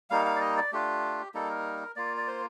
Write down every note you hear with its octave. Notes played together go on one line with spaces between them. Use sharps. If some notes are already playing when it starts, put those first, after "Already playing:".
G3 A#3 D#4 F5
F5
D5
D#5
D5
A3 D4 F4 G4
G3 A#3 D#4 A4
A#4
A#3 F4 D5
D5
C5